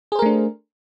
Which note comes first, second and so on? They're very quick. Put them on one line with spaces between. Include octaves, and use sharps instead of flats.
G#4 C5 A#4 A3 D4